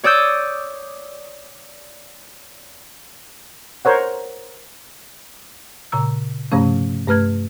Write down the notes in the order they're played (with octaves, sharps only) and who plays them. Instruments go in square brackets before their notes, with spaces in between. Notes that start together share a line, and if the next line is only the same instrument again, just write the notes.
[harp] C#5 D5 D#6 E6 G6
[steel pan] A#4 C5 C#5 F#5
[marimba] A#2 C#3 A#5 E6
G2 C3 F3 A3 C#4
G2 A3 B4 F6 G#6